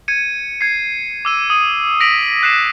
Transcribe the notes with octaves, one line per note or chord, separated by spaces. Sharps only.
G#6 C#7 D#7
G#6 C7
D6 E6 D#7
D#6 D#7
A#6 B6 D7 F7 F#7
F#6 C7 E7